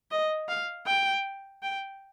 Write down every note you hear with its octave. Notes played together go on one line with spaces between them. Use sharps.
D#5
F5
G5
G5